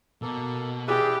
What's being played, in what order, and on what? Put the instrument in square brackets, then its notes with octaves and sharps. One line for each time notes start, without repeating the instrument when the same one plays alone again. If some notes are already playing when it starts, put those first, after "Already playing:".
[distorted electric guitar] B2 [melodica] A#3 A4
[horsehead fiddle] G4 [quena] G#4 [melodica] B4 D5 E5